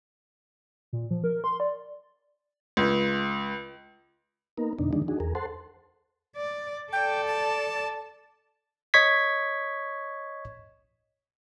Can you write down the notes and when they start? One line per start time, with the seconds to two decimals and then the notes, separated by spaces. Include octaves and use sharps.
0.93 A#2
1.11 F3
1.24 A#4
1.44 C6
1.60 D5
2.77 C#2
4.58 A#3 B3 D#4 A#4
4.79 F2 B2 D3 D4 D#4
4.93 D3 D#3 F3 G#3 D4 D#4
5.08 D4 D#4 F#4 G#4
5.20 E2 G#4 A#4
5.35 A4 C5 F#5 A5 C6
6.36 D5
6.93 A4 D5 G5
7.27 A5
8.94 C#5 D#5 C#6 G#6 B6